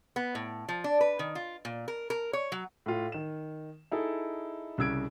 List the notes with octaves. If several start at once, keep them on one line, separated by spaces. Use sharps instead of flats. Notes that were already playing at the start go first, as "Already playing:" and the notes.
B3
A2
F3
D4
B4
D#3
F4
A#2
A#4
A#4
C#5
F#3
A2 F4
D#3 E7
D#4 E4 G#4 A4
C2 C#3 E6 G#6 D7